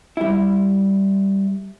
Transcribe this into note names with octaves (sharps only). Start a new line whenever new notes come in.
G3 E4